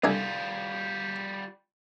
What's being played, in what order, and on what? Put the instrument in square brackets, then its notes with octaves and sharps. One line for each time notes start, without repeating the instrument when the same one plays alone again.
[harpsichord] C2 D3 G#5 [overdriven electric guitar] G3 F4